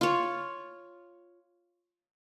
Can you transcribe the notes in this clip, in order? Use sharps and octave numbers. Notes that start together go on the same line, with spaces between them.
F4 C#5